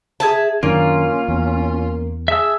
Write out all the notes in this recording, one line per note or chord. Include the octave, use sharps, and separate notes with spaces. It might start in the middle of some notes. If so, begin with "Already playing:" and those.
G#4 E5 A5
F#2 D#3 A#3 C#4 D4 F4
E2
G#4 E5 A5 E6